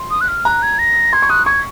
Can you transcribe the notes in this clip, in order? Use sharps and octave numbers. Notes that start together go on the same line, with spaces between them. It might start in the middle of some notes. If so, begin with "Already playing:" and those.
Already playing: C6
D#6
F#6
F6
A#5 F#6
G#6
A#6
C6 G#6
C#6
D#6 F#6
C#6 G#6